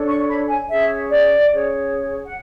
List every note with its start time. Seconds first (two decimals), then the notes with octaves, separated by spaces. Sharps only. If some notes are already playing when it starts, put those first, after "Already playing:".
Already playing: D4 A4 C#5
0.08 C#6
0.29 B5
0.48 G#5
0.69 C#4 G#4 C#5 E5
1.10 D5
1.51 C#4 G#4 C#5
2.23 F#5